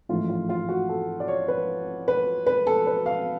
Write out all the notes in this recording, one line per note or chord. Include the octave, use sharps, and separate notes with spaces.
A1 G#2 F3 A3 F4
F4
F4
F#4
A4
D5
C#5
B4
B4
B4
A4
B4
F5